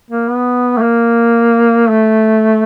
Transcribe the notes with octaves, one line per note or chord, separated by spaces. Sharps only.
A#3
B3
A3
A#3
A3